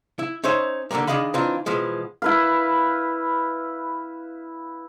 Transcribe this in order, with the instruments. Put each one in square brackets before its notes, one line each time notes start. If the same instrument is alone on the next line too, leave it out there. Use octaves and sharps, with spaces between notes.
[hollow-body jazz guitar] E4
C#4 D#4 C5 C#5 E5
D3 D#3 G3 G#3 A#3
D#3 D4 G#4 D#5 F5 B5
E3 C4 D4 D#4 F4
B2 E3 F3 G#3
[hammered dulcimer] E4 B4 F5